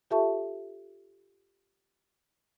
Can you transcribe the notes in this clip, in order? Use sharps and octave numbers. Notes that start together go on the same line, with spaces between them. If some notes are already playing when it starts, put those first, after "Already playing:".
F4 G4 A4 E5 A5 C#6